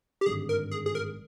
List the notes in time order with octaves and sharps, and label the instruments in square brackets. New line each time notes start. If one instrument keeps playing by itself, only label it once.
[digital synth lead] G4
[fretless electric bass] G#1 G2 D3 [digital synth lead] G#4
[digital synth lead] A#4
G#4
G#4
A#4